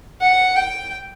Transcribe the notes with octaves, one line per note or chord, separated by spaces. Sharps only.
F#5
G5